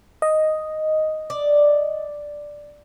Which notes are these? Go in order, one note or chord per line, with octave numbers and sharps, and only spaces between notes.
D#5
D5